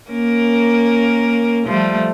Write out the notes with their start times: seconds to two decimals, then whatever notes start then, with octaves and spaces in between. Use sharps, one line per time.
0.10 A#3 C#4 A#4
1.67 F3 G3 A3